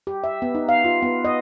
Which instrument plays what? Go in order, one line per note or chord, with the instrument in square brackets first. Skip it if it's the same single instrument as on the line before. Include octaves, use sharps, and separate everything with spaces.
[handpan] G4
E5
B3
D#4
F5
F4
B3
D#5